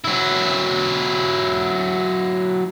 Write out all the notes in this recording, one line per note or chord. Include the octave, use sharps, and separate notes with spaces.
F#3 E4